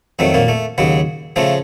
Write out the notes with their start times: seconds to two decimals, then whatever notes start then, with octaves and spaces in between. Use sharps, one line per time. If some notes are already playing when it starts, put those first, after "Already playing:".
0.19 F2 D#3 F#3 A3
0.34 A#2 A#3
0.48 A3
0.78 D#2 C#3 F#3
1.36 C#3 F3 A3